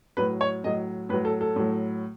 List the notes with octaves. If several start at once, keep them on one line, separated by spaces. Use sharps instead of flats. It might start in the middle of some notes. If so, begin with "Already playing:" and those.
A2 F#3 B4
C#5
A2 F#3 D#5
A2 F#3 B4
A4
A4
A2 F#3